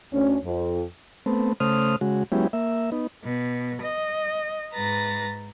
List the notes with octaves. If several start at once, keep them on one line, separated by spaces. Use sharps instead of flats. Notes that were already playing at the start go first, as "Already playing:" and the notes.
D2 C#4
F2
A3 B3 C4
C#3 A3 C5 D#6 F6
C#3 G#3 F#4
F#3 G#3 B3 C#4 E4 G4
A#3 E5
B3 D#4
B2
D#5
G#2 B4 A#5 A6 A#6